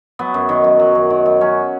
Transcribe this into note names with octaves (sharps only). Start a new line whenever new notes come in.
F#3 B3
F#2
D#3
F#2
F#3
F#2
D#3
F#2
F#3 C#4